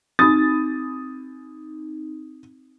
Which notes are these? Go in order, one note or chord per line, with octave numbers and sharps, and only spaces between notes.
C4 D#4 D#6 A6